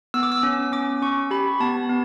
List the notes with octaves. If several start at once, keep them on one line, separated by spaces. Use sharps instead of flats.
B3 E6
D6
E6
C#4 E6
C#4 D6
C#4 C#6
G4 B5
B3 A5
B3